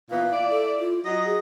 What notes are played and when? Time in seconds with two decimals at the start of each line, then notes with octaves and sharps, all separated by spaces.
0.11 A#2 E3 B3 F5
0.32 E4 D5
0.51 A4
0.79 F4
1.05 F#3 F#4 D#5
1.25 G#4